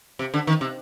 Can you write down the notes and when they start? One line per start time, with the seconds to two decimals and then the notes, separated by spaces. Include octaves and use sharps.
0.19 C3
0.34 D3
0.47 D#3
0.61 C3